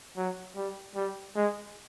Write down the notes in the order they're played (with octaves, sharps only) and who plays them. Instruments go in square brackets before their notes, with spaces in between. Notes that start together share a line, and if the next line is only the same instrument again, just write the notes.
[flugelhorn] F#3
G3
G3
G#3